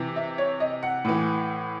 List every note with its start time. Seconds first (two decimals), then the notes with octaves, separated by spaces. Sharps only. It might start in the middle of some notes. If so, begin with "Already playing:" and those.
Already playing: C3 E3
0.16 E5
0.38 C#5
0.60 D#5
0.83 F#5
1.05 A2 E3